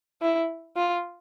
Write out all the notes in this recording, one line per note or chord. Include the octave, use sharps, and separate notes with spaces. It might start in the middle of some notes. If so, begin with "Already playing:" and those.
E4
F4